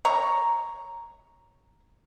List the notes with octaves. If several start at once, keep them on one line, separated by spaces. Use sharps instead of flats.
C#5 A#5